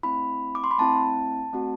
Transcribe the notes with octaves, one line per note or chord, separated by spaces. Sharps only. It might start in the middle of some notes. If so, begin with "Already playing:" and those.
A3 C4 E4 B5
D6
C6
B5
A3 C4 E4 A5
A3 C4 F#4